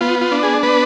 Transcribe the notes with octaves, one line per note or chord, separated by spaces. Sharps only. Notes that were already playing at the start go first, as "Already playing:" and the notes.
B3 F4
F4
D4
G#4
B3 B4